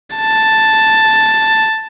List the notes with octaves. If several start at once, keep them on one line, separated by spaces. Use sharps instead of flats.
A5